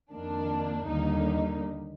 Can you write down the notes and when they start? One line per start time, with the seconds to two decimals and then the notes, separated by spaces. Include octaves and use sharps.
0.12 F2 D#3 A#3 D4
0.86 D#2 D3 G3 A#3 D#4